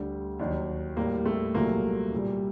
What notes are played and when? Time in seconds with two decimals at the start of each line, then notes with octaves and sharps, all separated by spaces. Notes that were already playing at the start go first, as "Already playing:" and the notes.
Already playing: D2 D3 G3
0.39 D#2 D#3 F#3 D4
0.97 A2 G3 A#3
1.25 A3
1.54 C2 A#2 F#3 A3 A#3
2.12 C2 A#2 G3